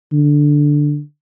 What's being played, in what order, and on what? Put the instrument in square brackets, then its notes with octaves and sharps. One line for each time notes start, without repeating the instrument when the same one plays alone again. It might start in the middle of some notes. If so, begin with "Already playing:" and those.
[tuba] D3